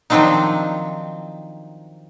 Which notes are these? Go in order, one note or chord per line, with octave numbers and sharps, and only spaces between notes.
D#3 F3 F#3 C4 D4 D#4